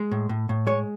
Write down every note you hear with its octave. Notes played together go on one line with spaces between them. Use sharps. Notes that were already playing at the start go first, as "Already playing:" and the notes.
Already playing: G#3
A2
A2
A2
G#3 C#5